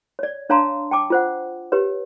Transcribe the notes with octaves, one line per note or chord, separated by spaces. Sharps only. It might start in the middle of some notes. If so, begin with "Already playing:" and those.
C#5 D5
D4 C#5 F5 A5 A#5 C6
G5 A5 D6
F4 C5 F#5
G4 B4 C#5